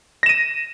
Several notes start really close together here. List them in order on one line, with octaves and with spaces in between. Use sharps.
A#6 E7 D#7